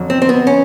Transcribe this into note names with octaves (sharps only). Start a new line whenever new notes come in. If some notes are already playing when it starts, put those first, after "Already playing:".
Already playing: F2 D3 F#3
C4
C4
B3
C#4